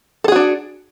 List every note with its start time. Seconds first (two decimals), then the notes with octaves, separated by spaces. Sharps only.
0.24 A4
0.28 G#4
0.32 F#4
0.36 D4